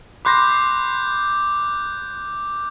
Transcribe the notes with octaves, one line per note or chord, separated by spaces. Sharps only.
B5 C6 D6 F#6 G6 A#6